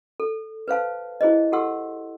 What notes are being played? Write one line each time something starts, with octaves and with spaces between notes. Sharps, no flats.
A4
B4 C5 F5 A5
E4 G#4 C5 D#5
G4 A4 F#5 C6 E6